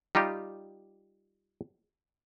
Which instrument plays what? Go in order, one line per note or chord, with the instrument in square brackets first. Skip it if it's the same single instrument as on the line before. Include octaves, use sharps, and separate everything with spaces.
[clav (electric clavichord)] G3 D#4 F4 G4